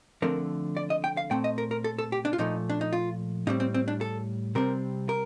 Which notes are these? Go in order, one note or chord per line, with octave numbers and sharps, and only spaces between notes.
D3 F3 A3 C4 A#4
D5
D#5
G5
F5
A#2 A3 C4 G5
D#5
A#4
A#4
A4
A4
G4
D4
F4
A#2 F3 A3 D#4
D4
D#4
F4
A2 G3 C4 D#4
C4
C4
D4
A4
C3 G3 C4 A#4
A#4